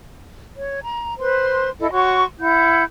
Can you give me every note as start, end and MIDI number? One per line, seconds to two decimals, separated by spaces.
0.55 0.80 73
0.82 1.14 82
1.18 1.69 71
1.18 1.69 72
1.18 1.69 84
1.80 1.90 64
1.80 1.90 69
1.80 1.90 75
1.92 2.23 66
1.92 2.23 73
1.92 2.23 84
1.92 2.23 85
2.39 2.83 64
2.39 2.83 78
2.39 2.83 91